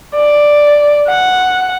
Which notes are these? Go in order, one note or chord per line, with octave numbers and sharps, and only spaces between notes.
D5
F#5